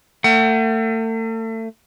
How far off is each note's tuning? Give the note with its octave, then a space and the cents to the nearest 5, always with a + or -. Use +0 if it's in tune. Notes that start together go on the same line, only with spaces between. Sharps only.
A3 +35 F#5 +30